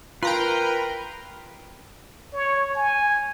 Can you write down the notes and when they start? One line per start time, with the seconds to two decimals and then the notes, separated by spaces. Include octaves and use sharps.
0.23 F4 A#4 B4 G5 A#5 C6
2.33 C#5
2.76 G#5